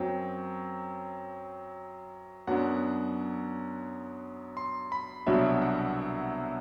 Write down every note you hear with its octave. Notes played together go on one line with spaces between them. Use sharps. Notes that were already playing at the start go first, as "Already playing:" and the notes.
Already playing: F#2 F#3 C4 G5
F#2 F#3 B3 D4 F#5
C6
B5
C2 B2 F#3 B3 D4 E5
F#5